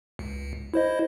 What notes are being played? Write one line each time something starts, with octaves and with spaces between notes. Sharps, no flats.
C#2
E4 C5 D#5